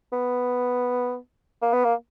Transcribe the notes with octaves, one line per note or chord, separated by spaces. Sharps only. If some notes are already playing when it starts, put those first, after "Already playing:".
B3
A#3
B3
A#3